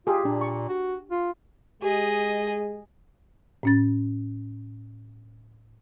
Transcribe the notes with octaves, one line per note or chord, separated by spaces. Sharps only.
F4 G4 G#4
A#2 D4
C#6
F#4
F4
G#3 G4 G#4 D#5
A2 C#4 A6